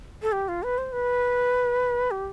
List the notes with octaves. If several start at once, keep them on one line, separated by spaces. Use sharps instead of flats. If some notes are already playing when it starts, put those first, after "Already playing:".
A4
G4
F4
B4
C5
B4
G4